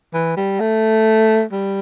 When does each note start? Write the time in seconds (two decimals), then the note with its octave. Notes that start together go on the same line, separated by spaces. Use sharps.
0.14 E3
0.37 G3
0.60 A3
1.52 G3